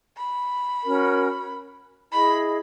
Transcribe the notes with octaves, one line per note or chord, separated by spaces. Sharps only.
B5
C#4 F#4 A#4
E4 G#4 D#5 B5